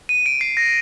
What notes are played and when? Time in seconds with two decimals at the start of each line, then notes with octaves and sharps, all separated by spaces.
0.09 D#7
0.26 D7
0.41 C7
0.57 A#6